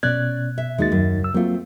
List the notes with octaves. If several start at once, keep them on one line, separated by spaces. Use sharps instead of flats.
B2 C#4 D5 F#6 G#6
E5
D#2 G#3 A#3 D#4 F#4 A6
F#2
C#2 E6
F#3 A3 A#3 C4 F4